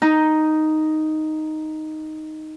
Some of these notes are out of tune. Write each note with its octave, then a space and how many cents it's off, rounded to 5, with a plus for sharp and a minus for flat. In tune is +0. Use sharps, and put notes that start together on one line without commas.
D#4 +0